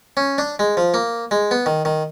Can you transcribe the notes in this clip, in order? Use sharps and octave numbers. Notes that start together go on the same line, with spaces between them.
C#4
D4
G#3
F3
A#3
G#3
B3
D#3
D#3